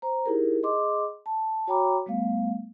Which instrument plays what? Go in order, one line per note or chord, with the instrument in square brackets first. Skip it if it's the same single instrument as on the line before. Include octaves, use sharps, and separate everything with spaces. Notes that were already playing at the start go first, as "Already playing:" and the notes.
[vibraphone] C5 A#5
D#4 E4 G4 G#4 A#4
G#4 D#5 C6 D6
A5
F#4 C#5 G5 A#5 B5 D6
G3 A3 B3 F5